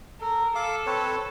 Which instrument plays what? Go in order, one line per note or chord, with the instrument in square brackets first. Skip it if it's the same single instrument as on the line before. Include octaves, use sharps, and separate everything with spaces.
[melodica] A4 [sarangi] A#4
[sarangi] A4 [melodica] F5 D6
[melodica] C4 B4 C#5